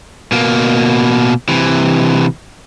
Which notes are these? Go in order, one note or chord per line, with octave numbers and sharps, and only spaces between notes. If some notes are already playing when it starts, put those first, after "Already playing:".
B2 A#3
C3 E3